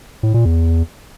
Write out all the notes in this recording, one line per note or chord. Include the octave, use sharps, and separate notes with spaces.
A2
A#2
E2